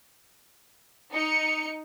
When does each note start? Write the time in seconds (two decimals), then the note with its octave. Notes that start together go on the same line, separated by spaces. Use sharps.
1.14 D#4 C#7